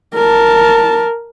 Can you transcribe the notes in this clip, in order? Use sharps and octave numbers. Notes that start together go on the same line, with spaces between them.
A#4 A5